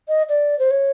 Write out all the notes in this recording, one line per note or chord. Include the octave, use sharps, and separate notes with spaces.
D#5
D5
C5
C#5